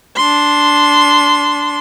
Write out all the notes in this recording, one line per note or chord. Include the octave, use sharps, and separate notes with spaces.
D4 C6